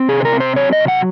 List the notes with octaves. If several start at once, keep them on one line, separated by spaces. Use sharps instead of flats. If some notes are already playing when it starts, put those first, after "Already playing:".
Already playing: C4
C3 G#4
C5
A#4
C4
C5
F#3 C#5
D#5
C3
F#5